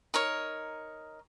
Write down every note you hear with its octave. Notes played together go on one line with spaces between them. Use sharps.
D#4 A#4 C#5